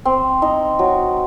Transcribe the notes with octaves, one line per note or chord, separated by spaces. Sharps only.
C4
D#4
F#3